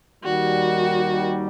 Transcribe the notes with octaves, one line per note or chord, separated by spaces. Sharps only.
D#2 D#3 G3 F#4